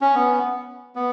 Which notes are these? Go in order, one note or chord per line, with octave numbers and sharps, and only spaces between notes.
C#4
B3
B3